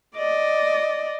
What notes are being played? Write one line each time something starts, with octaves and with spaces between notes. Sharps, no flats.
D5 D#5